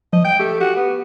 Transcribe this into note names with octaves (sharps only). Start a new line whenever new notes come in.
F3 D#5
G5 G6
A3 G4
F#4 G4
B3